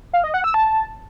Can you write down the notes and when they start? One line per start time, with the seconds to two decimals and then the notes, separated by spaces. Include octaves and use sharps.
0.13 F5
0.24 D#5
0.34 F#5
0.44 E6
0.54 A5